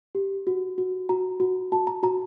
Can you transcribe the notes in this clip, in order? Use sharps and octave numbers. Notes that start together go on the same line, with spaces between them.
G4
F#4
F#4
F#4 A#5
F#4
F#4 A5
A#5
F#4 A#5